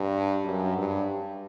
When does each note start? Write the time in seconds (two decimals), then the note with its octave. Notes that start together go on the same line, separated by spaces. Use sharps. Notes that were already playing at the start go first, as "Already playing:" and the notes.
Already playing: G2
0.45 F#2
0.78 G2